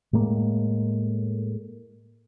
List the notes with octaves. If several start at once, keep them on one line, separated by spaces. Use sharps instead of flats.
A2 G#3 A#3